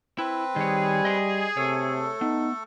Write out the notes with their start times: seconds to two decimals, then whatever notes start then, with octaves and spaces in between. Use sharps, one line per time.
0.18 C4 E4 B4
0.56 D#3 G3 G#4 C#5
1.05 D#5 C6
1.57 C3 A3 A4 C#5
2.21 B3 D#4